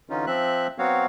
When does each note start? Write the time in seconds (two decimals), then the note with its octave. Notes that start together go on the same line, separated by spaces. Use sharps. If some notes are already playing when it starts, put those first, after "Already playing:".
0.10 D3 E3 C#4 D#4 F4
0.27 F3 C4 E5 F#6
0.79 F#3 B3 C4 F#4 C#5 F5